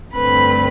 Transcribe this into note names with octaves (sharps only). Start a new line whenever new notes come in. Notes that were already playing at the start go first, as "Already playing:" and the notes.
G2 D3 A3 C4 B4 B5